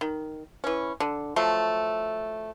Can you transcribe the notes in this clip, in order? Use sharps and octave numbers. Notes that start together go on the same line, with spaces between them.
D#3
E3 C#4
D3
F3 F#3 A3